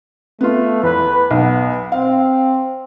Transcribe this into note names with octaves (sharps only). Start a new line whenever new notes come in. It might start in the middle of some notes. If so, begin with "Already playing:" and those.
A3 B3 F4
E2 B4
B1 B3
C4 F5